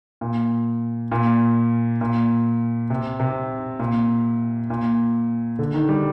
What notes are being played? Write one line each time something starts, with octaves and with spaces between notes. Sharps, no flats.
A#2
A#2
A#2
C3
C3
A#2
A#2
D3
D#3
G3